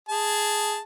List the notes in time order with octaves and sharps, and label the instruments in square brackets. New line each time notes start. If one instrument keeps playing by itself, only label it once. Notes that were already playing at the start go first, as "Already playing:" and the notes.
[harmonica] G#4 A5